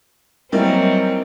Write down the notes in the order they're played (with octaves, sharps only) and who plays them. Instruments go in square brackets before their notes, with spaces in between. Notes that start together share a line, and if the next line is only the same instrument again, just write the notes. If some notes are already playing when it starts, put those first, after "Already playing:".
[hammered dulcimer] D#3 G#5 [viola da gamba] F#3 C4 [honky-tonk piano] G3 A#3 E4